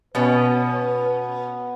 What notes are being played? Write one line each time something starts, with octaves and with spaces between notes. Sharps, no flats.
B2 B3 C#4 B4